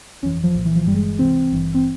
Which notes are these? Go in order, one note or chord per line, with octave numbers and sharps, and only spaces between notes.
G1 F2 E3 C#4
F3
C2 A#2 F3
E3
F3
G1 G2 E3 G3
G#3
C#2 C3 E3 C4
G#1 G2 E3
C4